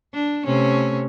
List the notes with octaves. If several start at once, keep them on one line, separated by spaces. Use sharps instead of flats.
D4
C3 A3 C#4